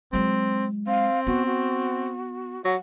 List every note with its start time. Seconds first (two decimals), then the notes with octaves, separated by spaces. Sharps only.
0.13 F#3 G#3 C4
0.87 C4 F5
1.27 B3 F#4
1.46 F#4
2.65 F#3 F#5